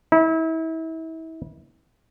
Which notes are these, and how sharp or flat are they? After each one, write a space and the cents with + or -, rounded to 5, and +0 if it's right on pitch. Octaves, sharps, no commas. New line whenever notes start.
E4 -35